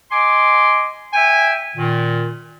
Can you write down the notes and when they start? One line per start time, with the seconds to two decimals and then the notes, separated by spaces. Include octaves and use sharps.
0.12 D#5 G#5 C6 D6
1.14 E5 G5 G#5
1.76 A#2 D#3